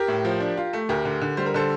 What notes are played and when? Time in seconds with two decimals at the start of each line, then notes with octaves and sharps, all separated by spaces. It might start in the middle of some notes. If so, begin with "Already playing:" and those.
Already playing: G4 A#4
0.08 A2
0.25 F3
0.40 D4
0.57 F4
0.73 A3
0.89 D2 G4 A#4
1.05 D3
1.21 D3
1.37 G3 C5
1.46 A#4
1.54 D3 A4 C5